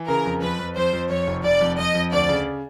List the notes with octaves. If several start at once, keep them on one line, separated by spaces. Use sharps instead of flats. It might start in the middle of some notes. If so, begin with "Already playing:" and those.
Already playing: E3
C#3 A#4
F2
F2 B4
F2
F2 C5
F2
F2 C#5
F1
F1 D5
F2
F2 D#5
F2
D2 D5
C#3